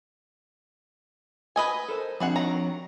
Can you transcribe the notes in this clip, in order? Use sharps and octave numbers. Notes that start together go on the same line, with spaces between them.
B4 D#5 G#5
A4 A#4 C5
F3 G3 C4 D4 G#4 F#5
D#3 F#3 A#5